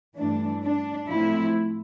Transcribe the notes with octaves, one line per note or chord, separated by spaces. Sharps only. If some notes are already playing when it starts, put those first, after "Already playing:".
G2 E3 A3 D4
D4
A2 F3 A3 C4 E4